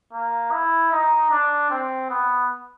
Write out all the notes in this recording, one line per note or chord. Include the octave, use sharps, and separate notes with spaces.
A#3
E4
D#4
D4
C4
B3